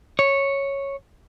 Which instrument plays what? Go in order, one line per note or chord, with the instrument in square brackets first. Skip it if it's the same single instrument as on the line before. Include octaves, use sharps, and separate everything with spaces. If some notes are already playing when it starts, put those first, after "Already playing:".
[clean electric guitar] C#5